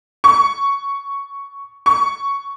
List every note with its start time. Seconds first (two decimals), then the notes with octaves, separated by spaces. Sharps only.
0.24 C#6
1.86 C#6